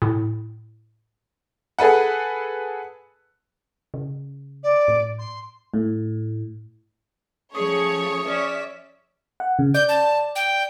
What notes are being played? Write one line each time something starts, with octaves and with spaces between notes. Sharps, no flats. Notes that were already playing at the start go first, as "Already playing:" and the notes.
A2
G#4 A4 B4 F#5
C#3
D5
A2
C6
A2
F3 A3 C#4 G#4 C#5 D#6
C#4 D5 E5
F#5
C#3
D5 G6
A5
G5